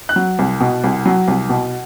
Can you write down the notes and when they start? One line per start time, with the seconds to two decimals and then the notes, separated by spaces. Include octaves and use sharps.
0.09 F#6
0.16 F#3
0.39 C2
0.60 B2
0.84 C2
1.06 F#3
1.28 C2
1.49 B2